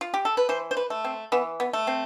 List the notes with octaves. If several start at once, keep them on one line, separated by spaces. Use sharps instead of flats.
F4
G4
A4
B4
E3 C5
C5
B4
A3
C4
E3 B3
B3
A3
C4